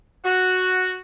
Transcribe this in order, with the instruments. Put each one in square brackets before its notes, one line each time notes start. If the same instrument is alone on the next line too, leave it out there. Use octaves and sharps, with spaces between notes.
[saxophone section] F#4